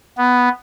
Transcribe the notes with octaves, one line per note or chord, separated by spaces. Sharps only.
B3